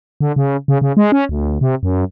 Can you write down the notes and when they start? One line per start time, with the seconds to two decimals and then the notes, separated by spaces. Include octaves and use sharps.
0.21 D3
0.36 C#3
0.68 C#3
0.81 C#3
0.97 G#3
1.12 C#4
1.29 D2
1.61 C3
1.83 F#2